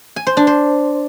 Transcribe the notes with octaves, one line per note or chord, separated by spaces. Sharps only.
G#5
C5
D4
C5